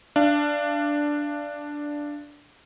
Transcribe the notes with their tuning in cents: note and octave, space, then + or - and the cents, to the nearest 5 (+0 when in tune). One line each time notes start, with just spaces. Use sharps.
D4 +0 F5 -35